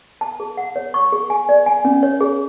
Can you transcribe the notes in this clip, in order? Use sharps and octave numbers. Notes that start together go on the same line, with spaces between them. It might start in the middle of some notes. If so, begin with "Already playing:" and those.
A5
G#4
F#5
C#5
C#6
G#4
G#5
D5
G#5
C#4
C#5
G#4